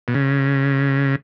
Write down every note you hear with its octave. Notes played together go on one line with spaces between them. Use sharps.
B2
C#3